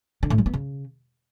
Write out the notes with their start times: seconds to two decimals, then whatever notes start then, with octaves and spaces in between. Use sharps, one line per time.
0.23 D3
0.30 A2
0.38 G3
0.46 B3
0.54 C#3